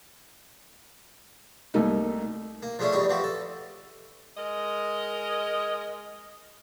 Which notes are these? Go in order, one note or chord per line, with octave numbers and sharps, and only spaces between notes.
C2 A3 A#3 D#4
A#3
F3 G#3 A3 C#4 D4
E2 G3 D#4 C#5
E3 F3 F#4 G4
A4
G#3 A#4 D#5